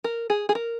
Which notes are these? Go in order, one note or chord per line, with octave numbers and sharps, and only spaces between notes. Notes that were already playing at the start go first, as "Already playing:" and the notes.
A#4
G#4
G#4
A#4